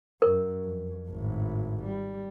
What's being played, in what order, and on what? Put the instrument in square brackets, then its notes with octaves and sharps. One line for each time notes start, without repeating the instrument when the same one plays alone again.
[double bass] F#2 [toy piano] A#4
[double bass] F2
G#1 A2
G3